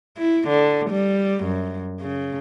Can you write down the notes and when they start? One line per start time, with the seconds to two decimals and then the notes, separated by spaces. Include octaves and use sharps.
0.18 E4
0.48 D3
0.90 G3
1.44 F#2
2.01 C#3